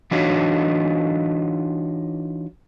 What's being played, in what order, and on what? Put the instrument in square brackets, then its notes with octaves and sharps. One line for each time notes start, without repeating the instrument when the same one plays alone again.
[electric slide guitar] E3 D4 D#4 F4 F#4 C#5